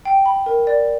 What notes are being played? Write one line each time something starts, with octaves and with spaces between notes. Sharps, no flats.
G5
B5
A#4
D5